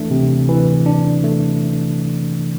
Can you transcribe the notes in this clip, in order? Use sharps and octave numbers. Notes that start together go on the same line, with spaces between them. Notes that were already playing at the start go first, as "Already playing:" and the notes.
Already playing: E3 A3 D4
C3
E3
D4
A3